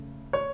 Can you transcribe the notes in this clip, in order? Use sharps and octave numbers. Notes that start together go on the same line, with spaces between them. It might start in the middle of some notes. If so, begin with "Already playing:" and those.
Already playing: C#3 A3
C#5